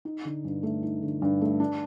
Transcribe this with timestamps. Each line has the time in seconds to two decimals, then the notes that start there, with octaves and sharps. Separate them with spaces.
0.05 D#4
0.25 D3
0.44 G2
0.63 A3
0.83 D#4
1.02 D3
1.22 G2
1.41 A3
1.60 D4